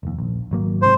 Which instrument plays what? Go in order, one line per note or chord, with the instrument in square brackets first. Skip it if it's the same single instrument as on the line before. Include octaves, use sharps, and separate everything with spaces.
[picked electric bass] F1 D#2
A#1
G#1 F#3 A#3
[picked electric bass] G#2 C3 [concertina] C5